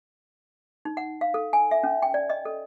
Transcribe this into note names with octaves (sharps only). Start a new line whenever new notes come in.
D#4
F#5
F5
A4
G#5
E5
C#4
G5
D5
D#5
A4